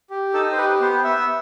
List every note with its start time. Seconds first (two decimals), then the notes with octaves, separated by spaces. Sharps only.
0.10 G4
0.34 D#4 A4
0.52 C5
0.58 G4 B4
0.80 B3 C5
1.04 B3 E5